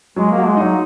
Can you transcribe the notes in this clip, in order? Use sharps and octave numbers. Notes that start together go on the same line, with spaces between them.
F#3 G#3
A#3
F#4
G#3
D#4
F#3